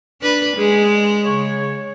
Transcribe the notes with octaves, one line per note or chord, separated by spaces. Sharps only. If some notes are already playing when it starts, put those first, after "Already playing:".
D4 B4
G#3 G#4
C#3 C#5